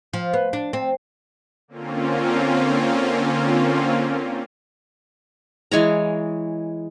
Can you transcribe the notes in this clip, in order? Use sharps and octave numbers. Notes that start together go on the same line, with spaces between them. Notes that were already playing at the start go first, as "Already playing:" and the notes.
F3
B3
D4
C4
D3 A#3 C4 C#4 F4
E3 G#3 C#5 A#5